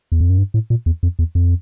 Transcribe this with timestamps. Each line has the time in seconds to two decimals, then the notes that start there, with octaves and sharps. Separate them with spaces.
0.12 E2
0.20 F2
0.30 F#2
0.38 G2
0.54 A2
0.70 A#2
0.86 E2
1.03 F2
1.19 E2
1.35 F2